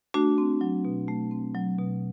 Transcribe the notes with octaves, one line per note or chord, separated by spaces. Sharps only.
A3 D4 F#4
C4
F#3
B2
A3
C4
F#3
B2